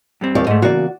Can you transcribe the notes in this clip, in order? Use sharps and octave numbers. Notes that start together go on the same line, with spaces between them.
G2 G3 C4
D#2 G4 D5
G#2 A3 D#5
E2 C#3 A#3 F#4 D5